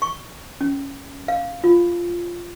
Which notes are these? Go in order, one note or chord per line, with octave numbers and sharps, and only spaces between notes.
C#6
C#4
F5
F4